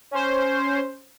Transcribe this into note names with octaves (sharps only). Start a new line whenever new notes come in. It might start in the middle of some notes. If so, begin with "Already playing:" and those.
C#4 C5